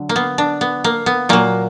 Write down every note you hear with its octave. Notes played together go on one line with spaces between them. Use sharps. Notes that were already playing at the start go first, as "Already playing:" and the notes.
Already playing: D3 F#3
A#3
B3
D4
B3
A#3
B3
A#2 F#3 A#3